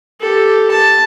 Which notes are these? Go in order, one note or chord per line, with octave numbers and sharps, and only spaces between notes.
G4 A4
A5